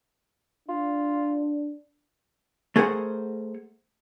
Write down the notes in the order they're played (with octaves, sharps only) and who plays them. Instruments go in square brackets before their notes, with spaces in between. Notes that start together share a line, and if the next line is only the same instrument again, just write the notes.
[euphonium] D4 [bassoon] F4
[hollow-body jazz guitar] A3 G#4 A#4 C5 F#5